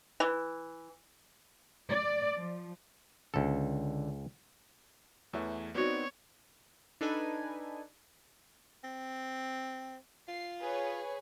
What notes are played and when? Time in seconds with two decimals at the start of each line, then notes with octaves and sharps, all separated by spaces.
0.20 E3
1.88 D5
2.36 F3
3.34 C#2 D3 A4
5.33 E2 E3 A3 C#5 E5
5.75 B3 C4 D#4 F#4 C#5 D5
7.01 D4 D#4 A4 B4 G#5
8.84 C4
10.28 F4 C7
10.60 G#4 B4 C#5